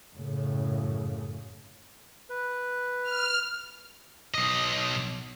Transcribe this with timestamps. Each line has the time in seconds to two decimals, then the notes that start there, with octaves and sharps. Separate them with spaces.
0.14 F#2 A2 C#3
2.30 B4
3.03 F6
4.34 B1 D#5